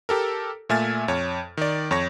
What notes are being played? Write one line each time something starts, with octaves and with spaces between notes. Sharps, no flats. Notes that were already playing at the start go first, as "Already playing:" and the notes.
G4 A4 A#4
A#2 A3 E5 G#5 F6 A6
F2 C#5
D#3 D5
F2 C#5 C#6 A#6